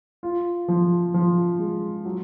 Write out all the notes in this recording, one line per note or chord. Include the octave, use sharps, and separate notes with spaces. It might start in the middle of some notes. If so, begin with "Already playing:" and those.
F4
F3
F3
G#3
F#3